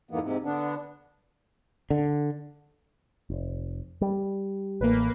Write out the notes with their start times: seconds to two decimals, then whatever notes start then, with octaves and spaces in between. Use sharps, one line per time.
0.11 F2 G#2 E3 A#3 B3
0.22 G#2 C3
0.44 D3 B3 D4
1.90 D3
3.30 F1
4.01 G3
4.81 A1 A#3 B4